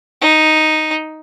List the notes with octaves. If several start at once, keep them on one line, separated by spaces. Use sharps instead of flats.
D#4